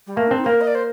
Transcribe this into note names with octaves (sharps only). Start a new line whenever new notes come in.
G3
A3 A#3
C4 D4
D#4
A#3 A#4 C5
D#5
D5
C5